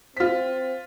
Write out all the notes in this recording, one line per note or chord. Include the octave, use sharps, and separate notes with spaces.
C4 F4 C5 B6